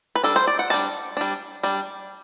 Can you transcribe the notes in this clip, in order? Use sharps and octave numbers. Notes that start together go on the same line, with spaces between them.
B4
G3 D4 A4
C5
D5
F#5
G3 D4 A5
G3 D4
G3 D4